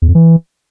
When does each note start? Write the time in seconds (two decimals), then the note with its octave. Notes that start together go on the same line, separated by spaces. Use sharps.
0.02 E2
0.08 F2
0.15 E3